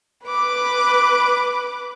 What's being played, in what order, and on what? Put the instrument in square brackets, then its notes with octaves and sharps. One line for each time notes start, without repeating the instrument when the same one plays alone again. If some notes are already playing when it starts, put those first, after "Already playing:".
[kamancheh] B4 D6